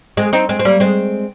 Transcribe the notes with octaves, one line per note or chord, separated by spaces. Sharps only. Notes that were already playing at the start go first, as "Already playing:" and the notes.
G#3 C4
C4 D#4
G#3 C4
C4
G3 A#3
G#3 C4